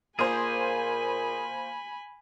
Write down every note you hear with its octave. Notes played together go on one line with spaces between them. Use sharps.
A#2 A#3 F4 G#4 C5 G#5 B5